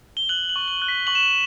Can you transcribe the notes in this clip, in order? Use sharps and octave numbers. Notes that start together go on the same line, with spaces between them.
G7
F#6 F#7
F#7
C#6
F#7
F#6
B6
C#6 F#7
E7
F#7